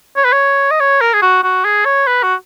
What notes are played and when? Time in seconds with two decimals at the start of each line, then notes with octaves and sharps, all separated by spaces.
0.17 C#5
0.25 B4
0.33 C#5
0.71 D#5
0.80 C#5
1.01 A#4
1.13 G#4
1.22 F#4
1.43 F#4
1.65 G#4
1.85 C#5
2.07 B4
2.23 F#4